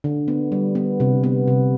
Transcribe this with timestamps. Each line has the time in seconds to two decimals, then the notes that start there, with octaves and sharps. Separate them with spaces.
0.04 D3
0.28 B3
0.52 G3
0.75 B3
1.00 C3
1.23 B3
1.48 C3